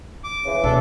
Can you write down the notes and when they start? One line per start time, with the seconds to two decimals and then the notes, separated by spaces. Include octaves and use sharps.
0.24 D6
0.45 C#3 E3
0.64 B2 D4 A4